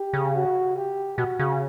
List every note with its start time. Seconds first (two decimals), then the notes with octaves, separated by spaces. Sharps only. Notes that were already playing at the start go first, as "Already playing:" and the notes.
Already playing: G4
0.13 C#3
0.35 F#4
0.77 G4
1.18 B2 F#4
1.39 C#3